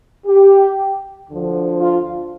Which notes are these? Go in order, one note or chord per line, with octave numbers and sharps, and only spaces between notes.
G4
D2 D3 F3
F4